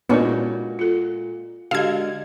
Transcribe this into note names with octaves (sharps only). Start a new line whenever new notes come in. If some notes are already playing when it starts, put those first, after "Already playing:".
A#2 G#3 B3 C#4 D4 E4 F#4 A#4
F4 A4
D3 G#3 F#4 G4 F5 G#6